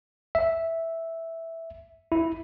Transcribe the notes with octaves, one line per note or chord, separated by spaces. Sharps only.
E5
E4